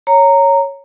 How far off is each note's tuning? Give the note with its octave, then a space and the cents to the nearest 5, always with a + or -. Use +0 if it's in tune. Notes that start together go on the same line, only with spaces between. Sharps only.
C#5 +0 A#5 -15